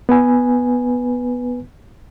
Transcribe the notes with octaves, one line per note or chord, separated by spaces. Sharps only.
B3 B4 G#5